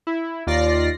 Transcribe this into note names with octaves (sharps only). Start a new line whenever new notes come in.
E4
D#2 F4 D5 A#6 C7